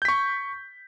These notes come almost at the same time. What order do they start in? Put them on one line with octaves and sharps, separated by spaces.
G6 B6 C#6